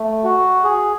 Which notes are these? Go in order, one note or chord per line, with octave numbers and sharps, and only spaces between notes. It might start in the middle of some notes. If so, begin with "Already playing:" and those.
Already playing: A3
F#4
G#4